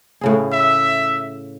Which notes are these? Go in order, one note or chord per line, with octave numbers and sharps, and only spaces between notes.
A2 C#3 G#4
E5